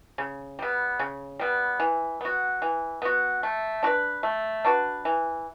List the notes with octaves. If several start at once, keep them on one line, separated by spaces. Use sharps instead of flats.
C#3
G3 B3
C#3
G3 B3
E3
B3 F#4
E3
B3 F#4
A3
D4 F#4 B4
A3
D4 F#4 B4
E3